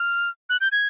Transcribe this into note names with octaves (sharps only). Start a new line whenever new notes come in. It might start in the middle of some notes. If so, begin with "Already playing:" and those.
Already playing: F6
F#6
G6
G#6